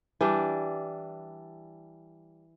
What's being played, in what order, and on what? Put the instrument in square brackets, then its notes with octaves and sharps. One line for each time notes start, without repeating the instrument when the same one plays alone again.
[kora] E3 G3 D4